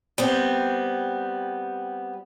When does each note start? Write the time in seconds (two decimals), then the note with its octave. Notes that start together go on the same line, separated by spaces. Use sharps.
0.18 G3 B3 C4